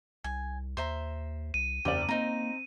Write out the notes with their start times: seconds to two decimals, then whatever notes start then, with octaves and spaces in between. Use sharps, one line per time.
0.24 C2 G#5
0.77 D#2 C5 E5 A#5
1.54 C2 D#7
1.85 F#1 E2 G4 D5
2.09 A#3 C4 D#4 A#5